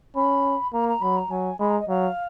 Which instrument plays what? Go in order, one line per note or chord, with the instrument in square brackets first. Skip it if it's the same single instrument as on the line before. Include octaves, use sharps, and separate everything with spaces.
[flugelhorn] C#4 [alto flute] B5
[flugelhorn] A#3 [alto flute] A#5
[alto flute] A#5
[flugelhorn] F#3 [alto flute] B5
[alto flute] A#5
[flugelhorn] F#3 [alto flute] G#5
[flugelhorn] G#3 [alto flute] B5
[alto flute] A#5
D#5
[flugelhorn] F#3 [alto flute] F5